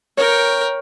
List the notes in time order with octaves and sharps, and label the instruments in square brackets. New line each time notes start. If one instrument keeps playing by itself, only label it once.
[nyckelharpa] A#4 G5 [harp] C#5